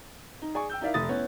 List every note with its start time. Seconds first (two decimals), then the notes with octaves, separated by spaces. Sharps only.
0.42 D#4
0.55 G#4 D5 G#5 C#6
0.70 G5 E6 G6
0.81 D#4 E4 A#4 D5 E5 F5
0.94 F1 A4 E5 D#6 A6
1.09 B3 C#4 E4 C#5